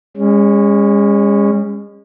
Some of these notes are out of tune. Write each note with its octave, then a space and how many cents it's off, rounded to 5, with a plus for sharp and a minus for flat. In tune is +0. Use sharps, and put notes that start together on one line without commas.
G#3 -35 C#4 +0